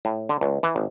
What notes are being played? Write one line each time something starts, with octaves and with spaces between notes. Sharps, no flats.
A2
D3
C#2
E3
G#1